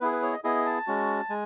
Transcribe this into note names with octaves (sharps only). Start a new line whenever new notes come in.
B3 E4 G#4 B4
B4
C#5
D#5
B3 E4 G#4 D#5
A5
G#3 C#4 F#4
G#3 G#5